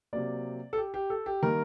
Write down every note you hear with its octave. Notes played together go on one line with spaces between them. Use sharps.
C3 F#3 A#3 D5
A4
G4
G4
A4
G4
D#3 G3 A#3 A#4